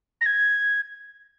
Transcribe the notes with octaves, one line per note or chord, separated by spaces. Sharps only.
A#6
G#6